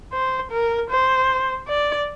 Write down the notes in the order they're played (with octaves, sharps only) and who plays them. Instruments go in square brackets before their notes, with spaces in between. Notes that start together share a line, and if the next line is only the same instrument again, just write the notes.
[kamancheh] C5
A#4
C5
D5